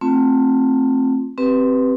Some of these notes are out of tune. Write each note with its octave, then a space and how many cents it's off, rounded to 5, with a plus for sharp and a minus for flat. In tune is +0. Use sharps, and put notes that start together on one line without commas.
A3 +20 C4 +15 F4 +0
C4 +0 G4 -10 B4 +0